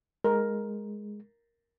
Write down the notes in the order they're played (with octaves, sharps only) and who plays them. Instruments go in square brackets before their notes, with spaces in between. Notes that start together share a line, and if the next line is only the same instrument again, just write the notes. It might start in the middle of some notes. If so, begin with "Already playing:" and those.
[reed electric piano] G#3 [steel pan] A#4